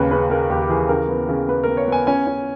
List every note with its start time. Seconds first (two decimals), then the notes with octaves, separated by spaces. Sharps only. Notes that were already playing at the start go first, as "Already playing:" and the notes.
Already playing: D#2 C#3 C#4 B4
0.11 C#3 B4
0.30 C#3 A#4
0.49 D#2 G4
0.62 G4
0.69 E3 G#4
0.89 C#3 A#4
1.08 B3
1.29 C#3
1.48 B3 B4
1.63 A#4
1.68 B3
1.77 C#5
1.88 B3 G#5
2.07 C#4 G#5
2.27 C#4